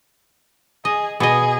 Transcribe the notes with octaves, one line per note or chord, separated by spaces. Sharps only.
G#4 D#5
B2 G#4 D#5